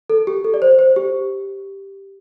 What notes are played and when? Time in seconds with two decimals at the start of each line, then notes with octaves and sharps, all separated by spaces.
0.10 A4
0.27 G4
0.44 A4
0.54 D5
0.62 C5
0.79 C5
0.96 G4